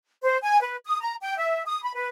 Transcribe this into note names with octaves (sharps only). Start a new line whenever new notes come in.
C5
G#5
B4
D#6
A#5
G5
E5
D#6
B5
B4